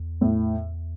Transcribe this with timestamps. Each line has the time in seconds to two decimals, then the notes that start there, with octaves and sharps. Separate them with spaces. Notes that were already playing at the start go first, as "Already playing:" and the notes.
Already playing: E2
0.21 A2